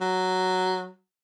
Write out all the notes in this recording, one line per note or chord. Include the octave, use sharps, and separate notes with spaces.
F#3